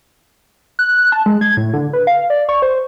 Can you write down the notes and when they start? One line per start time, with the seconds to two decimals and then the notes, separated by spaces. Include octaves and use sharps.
0.79 F#6
0.98 F#6
1.12 A5
1.26 G#3
1.41 G#6
1.57 A2
1.74 D3
1.93 B4
2.07 F5
2.30 D5
2.49 C#6
2.62 C5